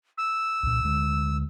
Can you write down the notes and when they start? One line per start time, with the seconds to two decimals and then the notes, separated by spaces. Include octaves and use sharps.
0.18 E6
0.63 C2 A#2
0.84 D2 G#3